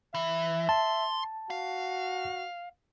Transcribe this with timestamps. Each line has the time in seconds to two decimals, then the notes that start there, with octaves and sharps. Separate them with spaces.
0.15 E3 E5
0.69 A5 C6
1.50 F#4 F5